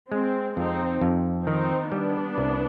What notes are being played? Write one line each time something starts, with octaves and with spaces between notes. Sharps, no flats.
G#3 C4
F2 C4 D#4
F2
D#3 C4 D#4
G3 B3 D4
C2